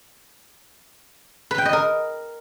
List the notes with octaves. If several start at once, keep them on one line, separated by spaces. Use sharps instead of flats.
B4
G5
D#5
A#4